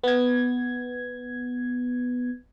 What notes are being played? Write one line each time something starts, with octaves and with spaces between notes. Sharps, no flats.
B3 G#6